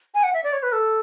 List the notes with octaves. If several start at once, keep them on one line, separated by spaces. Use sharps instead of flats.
G#5
F#5
E5
D5
C#5
B4
A4